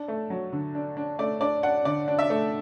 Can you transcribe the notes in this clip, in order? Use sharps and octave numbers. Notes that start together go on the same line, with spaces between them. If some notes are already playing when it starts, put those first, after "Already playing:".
Already playing: D4
A3
F#3
D3
D4
D4
A3 D5
D4 D5
D4 F#5
D3 D5
D4
E5
A3